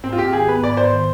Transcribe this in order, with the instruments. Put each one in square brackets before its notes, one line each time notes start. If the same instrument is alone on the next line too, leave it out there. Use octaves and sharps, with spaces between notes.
[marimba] G#2 [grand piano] C4
[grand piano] F4
[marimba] G#2 [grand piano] G4
[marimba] D#3 [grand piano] G#4
[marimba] B3 [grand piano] B4
[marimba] G#2 [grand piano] D5
[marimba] G#2 [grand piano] C5
[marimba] D#3